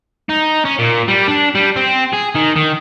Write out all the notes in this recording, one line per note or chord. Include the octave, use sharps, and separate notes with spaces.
D#4
C#4
A#2
G3
D4
G3
C4
G#4
D#3
D#3